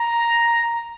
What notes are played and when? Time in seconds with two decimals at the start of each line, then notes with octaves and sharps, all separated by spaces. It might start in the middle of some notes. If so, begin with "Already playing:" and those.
Already playing: A#5